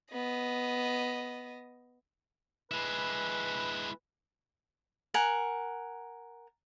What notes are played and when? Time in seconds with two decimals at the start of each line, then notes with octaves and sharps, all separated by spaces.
0.12 B3 D#5
2.71 G#3 E4 B4
5.14 A#4 F#5 G#5